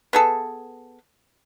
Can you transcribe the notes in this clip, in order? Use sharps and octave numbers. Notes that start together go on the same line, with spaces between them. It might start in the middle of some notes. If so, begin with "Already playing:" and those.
B3 G#4 A4